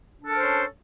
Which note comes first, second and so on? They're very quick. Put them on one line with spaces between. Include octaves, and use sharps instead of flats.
D4 A4 A#4 C5 C#4